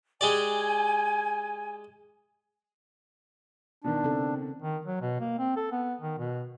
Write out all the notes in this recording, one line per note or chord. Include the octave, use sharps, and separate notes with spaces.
G#3 G4 D5 G#5
B2 D#3 D4
C#3 C4 A4
D#3
F#3
B2
A#3
C4
A4
B3
D#3
B2